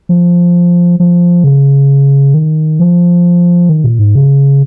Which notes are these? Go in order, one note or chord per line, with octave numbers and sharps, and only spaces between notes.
F3
F3
C#3
D#3
F3
D#3
A#2
G#2
C#3